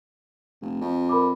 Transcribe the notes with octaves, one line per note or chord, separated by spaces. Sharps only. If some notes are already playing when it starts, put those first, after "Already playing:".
F1
F2
A#4 B5 D6